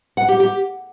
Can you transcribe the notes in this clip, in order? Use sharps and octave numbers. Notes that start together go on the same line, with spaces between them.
F#5
G4
G4